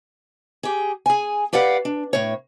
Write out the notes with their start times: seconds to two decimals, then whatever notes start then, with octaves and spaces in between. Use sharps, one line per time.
0.63 G4 G#4
1.06 G#4 G#5
1.53 G4 B4 D5 F5 F#5
1.85 D4
2.13 A2 C#5